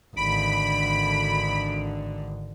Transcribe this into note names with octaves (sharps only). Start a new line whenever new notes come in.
G#1 D3 B5 D7